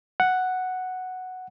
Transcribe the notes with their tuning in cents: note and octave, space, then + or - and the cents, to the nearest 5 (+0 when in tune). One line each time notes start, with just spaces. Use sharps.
F#5 +0